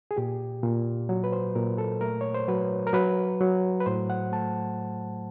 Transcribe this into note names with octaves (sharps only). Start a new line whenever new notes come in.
G#4
A#2 G4
A#2
F#3
B4
C5
A#2 A#4
A4
A3 A#4
C#5
C5
F#3 B4
A#4
F#3 B4
F#3
B4
A2 C5
F#5
A3 A5